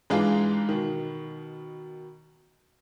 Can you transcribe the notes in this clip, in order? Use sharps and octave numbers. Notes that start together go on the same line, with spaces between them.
G#2 E3 G#3 D4 F4 G#4
B2 D#3